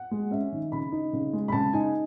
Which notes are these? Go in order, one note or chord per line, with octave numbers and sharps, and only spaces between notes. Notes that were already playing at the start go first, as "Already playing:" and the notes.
Already playing: F#5
G#3
C#4 E5
D#3
C#3 B5
D#4
C#3
G#3
B5
C#3 A5
D#4 G#5